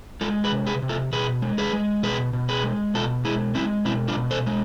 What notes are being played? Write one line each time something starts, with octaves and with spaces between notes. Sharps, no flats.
G#3 F4 A4
G#4 B4
C3
G#4 B4
C3
F4 A4
B2 G#4 B4
G#3
G#4 B4
G#3
B2 G#4 B4
B2
G#4 B4
G#3
B2 F4 A4
G#3 E4 G#4
G#3 C4 E4
B2 C4 E4
D4 F4
B2
A4 C5
G#3